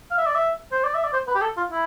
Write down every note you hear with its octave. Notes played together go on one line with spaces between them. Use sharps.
F5
E5
D5
E5
C5
D5
E5
D5
C5
B4
G4
A4
F4
E4